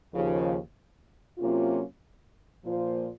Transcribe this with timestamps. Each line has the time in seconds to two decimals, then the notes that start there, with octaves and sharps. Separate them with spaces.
0.13 D#2 C#3 F3
1.39 C3 F#3 A#3 C#4 F4
2.64 A#2 F3 A#3 F4 C5